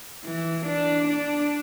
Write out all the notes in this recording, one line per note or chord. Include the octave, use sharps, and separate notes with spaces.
E3
D4
D4